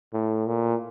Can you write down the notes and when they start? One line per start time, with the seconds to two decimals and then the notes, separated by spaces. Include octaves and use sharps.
0.13 A2
0.47 A#2